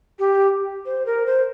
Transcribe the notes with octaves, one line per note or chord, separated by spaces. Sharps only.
G4
C5
A#4
C5